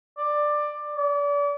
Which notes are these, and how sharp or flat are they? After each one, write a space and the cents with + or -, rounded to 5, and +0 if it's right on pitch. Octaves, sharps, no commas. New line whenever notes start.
D5 +15
D5 -35